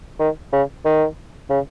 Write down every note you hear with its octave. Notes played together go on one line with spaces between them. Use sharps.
D#3
C#3
D#3
C#3